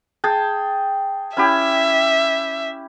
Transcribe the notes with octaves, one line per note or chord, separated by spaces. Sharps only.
G#4 G5 A5
C#4 E4 G4 E5